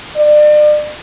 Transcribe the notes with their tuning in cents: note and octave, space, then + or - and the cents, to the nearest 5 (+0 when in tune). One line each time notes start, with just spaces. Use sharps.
D5 +35